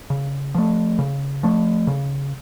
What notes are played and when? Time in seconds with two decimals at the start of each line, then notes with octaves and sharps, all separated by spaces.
0.10 C#3
0.55 F3 A3
0.99 C#3
1.43 F3 A3
1.87 C#3